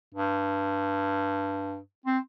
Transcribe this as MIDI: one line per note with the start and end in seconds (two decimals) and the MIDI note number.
0.14 1.79 43
2.06 2.19 60